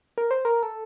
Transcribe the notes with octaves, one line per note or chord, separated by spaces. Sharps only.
A#4
C5
A#4
A4